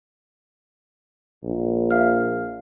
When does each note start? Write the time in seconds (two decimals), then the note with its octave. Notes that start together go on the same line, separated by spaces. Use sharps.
1.43 A#1
1.91 E5 F5 F6